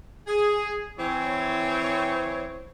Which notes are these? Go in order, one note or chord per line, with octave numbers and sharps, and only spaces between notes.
G#4
E3 C4 C#5